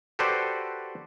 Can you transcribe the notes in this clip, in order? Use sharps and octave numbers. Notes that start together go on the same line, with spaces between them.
F#4 G4 A4 B4 C5 D5